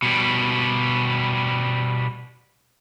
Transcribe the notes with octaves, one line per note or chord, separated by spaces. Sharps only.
B2 G3